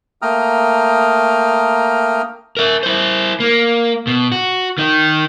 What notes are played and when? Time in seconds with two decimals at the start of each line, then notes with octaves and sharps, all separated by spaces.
0.22 A3 A#3 G5 A#5 D#6 F6
2.57 A#4 E5
2.83 E4 C5
3.40 A#3
4.07 B2
4.32 F#4
4.78 D#3 D#4